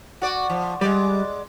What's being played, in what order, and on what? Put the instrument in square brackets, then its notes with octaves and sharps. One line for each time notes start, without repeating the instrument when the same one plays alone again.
[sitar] F#4 D5
F3
[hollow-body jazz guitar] G3 [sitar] G#3 D5